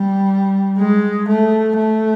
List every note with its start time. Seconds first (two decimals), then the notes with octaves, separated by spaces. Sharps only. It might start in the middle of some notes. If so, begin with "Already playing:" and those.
Already playing: G3
0.79 G#3
1.29 A3
1.78 A3